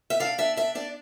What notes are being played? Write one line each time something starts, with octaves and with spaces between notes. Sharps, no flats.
E5
D4 F5
D4 E5
D4 E5
D4 D5